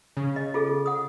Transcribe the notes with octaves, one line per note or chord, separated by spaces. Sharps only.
C#3
D#5
F4 G#4 A4
F#5 D#6